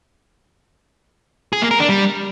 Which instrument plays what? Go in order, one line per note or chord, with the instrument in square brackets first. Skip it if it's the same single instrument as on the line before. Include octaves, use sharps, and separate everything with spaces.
[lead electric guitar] G#4
A#3
A#4
D4
G3